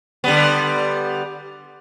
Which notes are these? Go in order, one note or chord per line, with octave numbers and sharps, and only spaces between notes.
D3 G3 B3